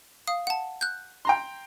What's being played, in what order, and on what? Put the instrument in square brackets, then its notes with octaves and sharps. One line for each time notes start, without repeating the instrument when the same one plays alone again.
[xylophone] F5 D#6
F#5 A5
F#6 G6
[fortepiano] G5 A#5 C6